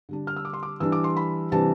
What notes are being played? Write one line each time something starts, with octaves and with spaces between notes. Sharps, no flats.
D3 G3 D4
F6
E6
D6
C6
D6
E3 G3 D4 E6
D6
C6
B5
C3 E3 G3 D4 A5